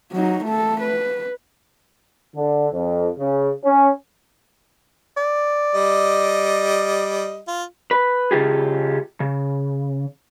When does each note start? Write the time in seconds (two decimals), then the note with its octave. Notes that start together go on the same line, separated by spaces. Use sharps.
0.12 F#3 D#4
0.45 A3 A4
0.81 B4
2.36 D3
2.73 F2
3.19 C#3
3.64 C#4
5.17 D5
5.75 G3 D#5
7.48 F4
7.91 B4
8.31 C#3 F4 G4 G#4
9.20 C#3